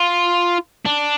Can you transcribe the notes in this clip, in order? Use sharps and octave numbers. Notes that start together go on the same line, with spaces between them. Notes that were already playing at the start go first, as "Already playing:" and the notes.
Already playing: F4
D4